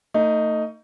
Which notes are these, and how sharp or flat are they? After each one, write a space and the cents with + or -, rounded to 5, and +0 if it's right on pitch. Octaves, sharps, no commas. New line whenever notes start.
A3 +35 D#4 +0